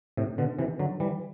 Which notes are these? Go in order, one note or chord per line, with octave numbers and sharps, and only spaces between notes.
A2 C3
B2 D3
C3 E3
D3 F#3
E3 G3